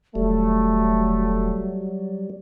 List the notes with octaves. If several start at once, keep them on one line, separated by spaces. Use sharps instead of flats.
E1 F#3 G3 A3